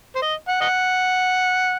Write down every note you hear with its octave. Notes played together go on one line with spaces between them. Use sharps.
C5
D#5
F#5
D#5 F#5